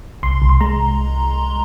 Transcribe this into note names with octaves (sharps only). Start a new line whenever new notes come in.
C2 C6
C2
C6
G#3 A#5